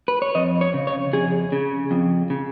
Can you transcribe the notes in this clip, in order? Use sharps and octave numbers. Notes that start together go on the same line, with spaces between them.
B4
C#5
F2 D#5
C#5
C#3
C#5
F2 G#4
C#3
F2
C#3